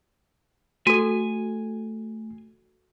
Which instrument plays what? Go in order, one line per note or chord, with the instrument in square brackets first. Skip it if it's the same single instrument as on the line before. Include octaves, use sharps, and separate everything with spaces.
[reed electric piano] A3 [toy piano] F#4 A4 [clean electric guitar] G#5